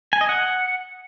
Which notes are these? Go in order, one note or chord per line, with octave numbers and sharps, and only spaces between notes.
G#5
D#5
F#5